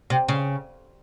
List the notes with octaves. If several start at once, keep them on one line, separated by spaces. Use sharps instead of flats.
C3
C#3